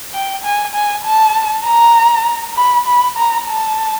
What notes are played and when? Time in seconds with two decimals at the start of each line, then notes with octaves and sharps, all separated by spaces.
0.14 G5
0.44 G#5
0.75 G#5
1.04 A5
1.66 A#5
2.56 B5
2.86 B5
3.17 A#5
3.47 A5